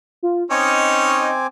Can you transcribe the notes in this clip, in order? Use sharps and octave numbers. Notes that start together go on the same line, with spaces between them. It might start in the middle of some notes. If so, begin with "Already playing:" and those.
F4
C4 C#4 D#4 C#5 D#5 G#5 D6